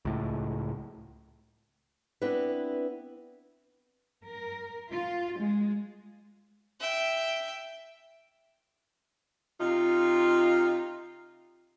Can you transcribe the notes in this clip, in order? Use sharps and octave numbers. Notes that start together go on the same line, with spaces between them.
C#2 A2
B3 C4 D4 E4 B4
A#4
F4
G#3
E5 G5
C3 D#4 F4